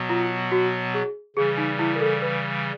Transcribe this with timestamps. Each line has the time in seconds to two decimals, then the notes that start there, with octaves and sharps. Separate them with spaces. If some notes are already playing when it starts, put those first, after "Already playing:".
Already playing: B2 F#3 B3
0.09 F4
0.52 F#4
0.94 G#4
1.36 C#3 E3 G3 G#4
1.58 D#4
1.79 E4
1.96 A#4
2.00 A4
2.22 B4